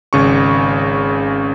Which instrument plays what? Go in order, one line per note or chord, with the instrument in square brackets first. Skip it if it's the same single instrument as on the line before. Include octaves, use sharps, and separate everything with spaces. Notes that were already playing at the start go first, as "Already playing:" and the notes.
[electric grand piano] G#1 C#3 C#6